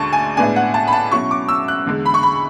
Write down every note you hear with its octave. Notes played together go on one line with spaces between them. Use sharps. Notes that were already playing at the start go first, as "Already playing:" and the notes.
Already playing: D2 D3 G#3 D4 A5 C#6
G#5
A2 G#3 B3 D4 G#5
F#5
A5
B5
A5
B2 F#3 C#4 E4 C#6
D6
E6
F#6
E2 D3 G#3
B5
C#6
B5